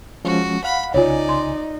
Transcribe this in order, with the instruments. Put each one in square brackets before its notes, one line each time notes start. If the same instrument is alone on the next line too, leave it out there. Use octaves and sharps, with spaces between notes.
[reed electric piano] F3 G#3 C#4 [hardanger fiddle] F#4
[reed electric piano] F5 F#5 [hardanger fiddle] B5
[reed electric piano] C2 C#3 G#5 [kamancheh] D#4 [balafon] F4 C#5 [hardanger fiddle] D5
[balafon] C6